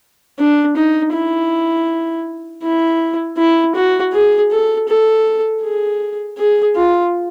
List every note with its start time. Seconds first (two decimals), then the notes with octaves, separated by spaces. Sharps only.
0.39 D4
0.76 D#4
1.13 E4
2.63 E4
3.38 E4
3.75 F#4
4.13 G#4
4.51 A4
4.88 A4
5.63 G#4
6.38 G#4
6.76 F4